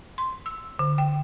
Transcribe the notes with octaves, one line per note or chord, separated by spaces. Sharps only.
C6
E6
D3
G5